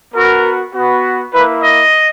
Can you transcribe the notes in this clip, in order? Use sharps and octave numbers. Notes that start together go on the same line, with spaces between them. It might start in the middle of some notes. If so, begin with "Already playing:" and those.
B3 F#4 A#4
B3 F#4
A#3 E4 B4
D#5